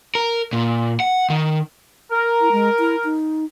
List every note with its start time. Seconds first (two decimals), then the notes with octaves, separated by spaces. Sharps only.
0.15 A#4
0.53 A#2
1.00 F#5
1.30 D#3
2.12 A#4
2.41 E4
2.52 G#3
2.79 E4
3.04 D#4